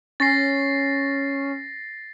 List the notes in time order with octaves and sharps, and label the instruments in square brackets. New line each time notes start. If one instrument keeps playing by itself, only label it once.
[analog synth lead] C#4 [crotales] A6 A#6 C7